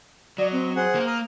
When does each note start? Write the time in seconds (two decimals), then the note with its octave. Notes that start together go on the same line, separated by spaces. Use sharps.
0.38 F#3 D5 D#5
0.52 C4
0.76 G#4 C5 F#5
0.95 A#3 A#4
1.07 A#5 D#6 F6